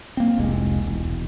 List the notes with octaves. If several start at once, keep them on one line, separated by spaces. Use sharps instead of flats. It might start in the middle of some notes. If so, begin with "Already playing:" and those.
A#3 C4
F1 C2 G#3
E1